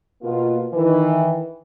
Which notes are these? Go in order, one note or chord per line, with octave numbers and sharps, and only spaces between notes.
B2 A#3 F4
D#3 E3